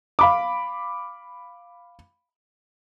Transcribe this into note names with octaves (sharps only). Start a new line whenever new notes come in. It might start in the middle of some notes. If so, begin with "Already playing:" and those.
F5 B5 D6